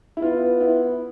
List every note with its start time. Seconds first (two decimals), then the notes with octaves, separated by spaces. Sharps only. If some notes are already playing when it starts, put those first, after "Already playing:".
0.17 E4
0.22 B3 F4
0.61 E4